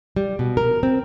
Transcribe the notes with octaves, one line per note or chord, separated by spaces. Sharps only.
G3
B2
A#4
C4